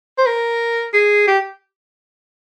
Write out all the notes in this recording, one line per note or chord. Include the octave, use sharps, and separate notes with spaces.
C5
A#4
G#4
G4